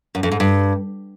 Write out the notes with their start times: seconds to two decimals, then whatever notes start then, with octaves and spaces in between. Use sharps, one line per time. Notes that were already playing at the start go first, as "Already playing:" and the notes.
0.15 F#2
0.23 F2
0.31 G#2
0.40 G2